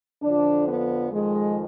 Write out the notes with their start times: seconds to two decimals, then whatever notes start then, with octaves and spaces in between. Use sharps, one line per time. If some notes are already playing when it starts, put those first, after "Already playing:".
0.22 F2 D3 F3 D4
0.66 B3
1.11 F2 D#3 G#3